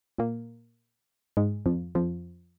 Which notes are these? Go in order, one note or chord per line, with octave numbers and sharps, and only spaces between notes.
A#2 A#3
G#2 G#3
F2 F3
F2 F3